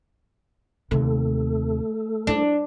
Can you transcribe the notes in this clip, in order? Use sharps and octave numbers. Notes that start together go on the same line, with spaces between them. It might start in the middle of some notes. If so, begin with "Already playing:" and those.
D#2 C3 A3 A4
D4 E4